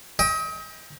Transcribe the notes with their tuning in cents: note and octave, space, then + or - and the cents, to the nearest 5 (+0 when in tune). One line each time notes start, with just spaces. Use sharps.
D#5 +40 G5 +15